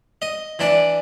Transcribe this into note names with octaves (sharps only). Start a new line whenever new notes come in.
D#5
E3 D4 D5